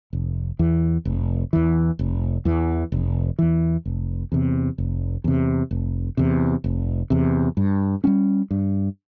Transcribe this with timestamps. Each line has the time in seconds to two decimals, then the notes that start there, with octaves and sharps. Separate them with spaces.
0.13 F1
0.59 E2 E3
1.05 F1
1.53 E2 E3
1.99 F1
2.45 E2 E3
2.92 F1
3.39 E2 E3
3.86 F1
4.32 E2 C3
4.78 F1
5.24 E2 C3
5.71 F1
6.17 E2 C3
6.64 F1
7.10 E2 C3
7.57 G2
8.04 G3 A#3 C#4
8.51 G2